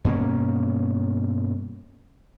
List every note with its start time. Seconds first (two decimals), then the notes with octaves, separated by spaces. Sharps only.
0.04 G2 B2 A#3 C#4